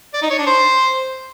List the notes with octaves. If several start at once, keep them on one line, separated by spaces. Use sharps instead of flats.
D5
D#4
C#5
D4
C5